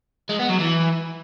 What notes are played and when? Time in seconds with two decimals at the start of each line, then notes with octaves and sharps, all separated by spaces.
0.29 G#3
0.39 B3
0.49 F#3
0.60 E3